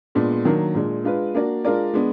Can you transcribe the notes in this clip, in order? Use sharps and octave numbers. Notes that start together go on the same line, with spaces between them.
A#2 G#3 B3 D4
D#3 F#3 A#3 D4
A#2 G#3 D4
G#3 D4 F4 B4
A#3 D4 F#4 D5
G#3 D4 F4 A#4 D5
G#3 B3 D4